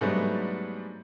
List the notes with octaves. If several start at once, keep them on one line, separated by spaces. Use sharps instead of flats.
G#2 F#3 G3 A3 B3 D4